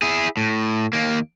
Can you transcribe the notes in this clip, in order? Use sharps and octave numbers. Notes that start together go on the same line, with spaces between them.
E4 G#4
A2
D#2 A#3